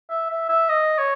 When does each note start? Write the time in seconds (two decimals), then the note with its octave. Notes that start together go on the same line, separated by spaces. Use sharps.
0.10 E5
0.30 E5
0.49 E5
0.69 D#5
0.98 C#5